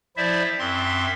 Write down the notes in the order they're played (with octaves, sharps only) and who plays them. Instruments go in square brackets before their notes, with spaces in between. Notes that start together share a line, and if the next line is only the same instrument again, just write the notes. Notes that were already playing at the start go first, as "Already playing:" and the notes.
[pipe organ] F3 E4 C5 D5 E5
F#2 C4 E5 C6